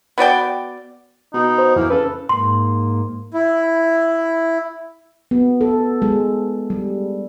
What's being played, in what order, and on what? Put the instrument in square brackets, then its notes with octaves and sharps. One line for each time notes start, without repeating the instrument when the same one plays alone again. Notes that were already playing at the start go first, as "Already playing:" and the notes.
[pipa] B3 F#4 D5 G5
[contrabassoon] B2 [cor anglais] D#4
[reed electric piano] C5
[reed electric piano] F2 [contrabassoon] E3 [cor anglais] A#3
[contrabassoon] C#3 [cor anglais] A4 [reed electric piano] B4
[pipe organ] G#2 A#3 [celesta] C6
[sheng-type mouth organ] E4
[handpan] B3
A4
G#3
G3